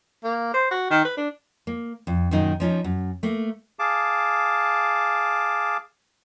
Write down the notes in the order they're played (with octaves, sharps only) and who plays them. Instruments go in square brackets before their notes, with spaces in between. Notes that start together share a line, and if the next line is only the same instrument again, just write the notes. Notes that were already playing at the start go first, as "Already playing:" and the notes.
[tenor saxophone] A#3
C5
F#4
D#3
B4
D4
[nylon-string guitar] A#3
F2
F#2 A#2 D#3 D#4
F3 C#4 D#4
F#2
A3 A#3
[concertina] G#4 F5 A5 D6